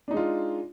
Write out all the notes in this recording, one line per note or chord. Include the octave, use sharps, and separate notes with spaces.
G#3 D4 D#4 F4